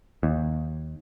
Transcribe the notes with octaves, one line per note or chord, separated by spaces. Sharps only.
D#2